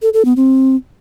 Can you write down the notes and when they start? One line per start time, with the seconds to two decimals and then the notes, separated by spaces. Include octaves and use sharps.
0.02 A4
0.14 A4
0.25 B3
0.36 C4